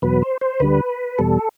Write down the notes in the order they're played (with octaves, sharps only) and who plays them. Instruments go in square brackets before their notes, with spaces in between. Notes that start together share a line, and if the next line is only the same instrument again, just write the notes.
[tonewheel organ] E2 B2 F#3 B4
C5
C5
D2 D3 G3 B4
E2 B2 G3 A4